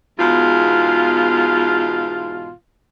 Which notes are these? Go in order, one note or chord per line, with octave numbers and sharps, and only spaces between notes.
E2 G#2 B2 F4